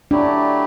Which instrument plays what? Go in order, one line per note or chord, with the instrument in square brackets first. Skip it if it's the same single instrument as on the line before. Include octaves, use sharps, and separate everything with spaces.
[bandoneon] F#3 A3 E4 G4 [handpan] D4